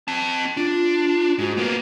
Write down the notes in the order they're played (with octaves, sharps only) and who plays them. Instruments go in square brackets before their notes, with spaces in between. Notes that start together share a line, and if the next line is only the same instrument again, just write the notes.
[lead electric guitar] C4 A5
[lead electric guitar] D4 [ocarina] F4
[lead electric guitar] G#2 [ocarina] F#4
[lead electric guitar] A#3 B3